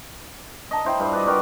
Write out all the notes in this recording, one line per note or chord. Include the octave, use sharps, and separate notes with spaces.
D#5 A5 A#5
E4 C5 G5 B5
G2 F4
B4 D5 D#5
G3 F#4 G4 A#4